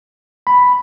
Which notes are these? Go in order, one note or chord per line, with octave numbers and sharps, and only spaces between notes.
B5